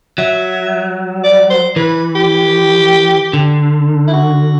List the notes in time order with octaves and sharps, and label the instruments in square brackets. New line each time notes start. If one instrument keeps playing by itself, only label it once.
[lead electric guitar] F#3 [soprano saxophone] E5
[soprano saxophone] D5
C5
[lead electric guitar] E3 [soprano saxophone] B4
[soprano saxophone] G4
[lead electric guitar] D3
[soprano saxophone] E4
F#4